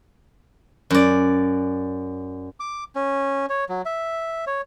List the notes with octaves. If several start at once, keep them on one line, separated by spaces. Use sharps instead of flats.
F#2 D5
D6
C#4
C#5
F#3
E5
C#5